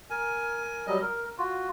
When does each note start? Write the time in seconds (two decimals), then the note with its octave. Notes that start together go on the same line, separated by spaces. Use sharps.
0.10 A#4 G#5
0.87 F#3 G3 D#5
1.02 A#4
1.38 F4 F#4